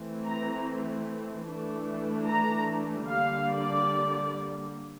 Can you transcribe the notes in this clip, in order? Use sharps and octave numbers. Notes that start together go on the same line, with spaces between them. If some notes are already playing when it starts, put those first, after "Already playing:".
Already playing: E3 A3 C4
A#5
E3 A3 D4
A#5
D3 G3 A#3 F5
D5